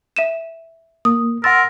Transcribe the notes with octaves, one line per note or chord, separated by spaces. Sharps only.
E5 D#7 E7
A#3 D#6
A#4 F#5 C6 E6 A6